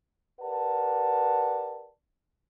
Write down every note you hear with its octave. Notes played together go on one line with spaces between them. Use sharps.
G4 A#4 B4 D5 F#5 A5